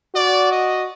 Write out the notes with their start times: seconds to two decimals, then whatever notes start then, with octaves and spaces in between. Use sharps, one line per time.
0.15 F#4 D5
0.51 D#5